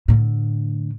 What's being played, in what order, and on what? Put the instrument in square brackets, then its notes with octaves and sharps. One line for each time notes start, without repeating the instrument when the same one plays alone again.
[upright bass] A2 D3